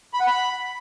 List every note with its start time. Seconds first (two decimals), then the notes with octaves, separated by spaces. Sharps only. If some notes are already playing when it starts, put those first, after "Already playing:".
0.14 B5
0.20 F#5
0.27 B5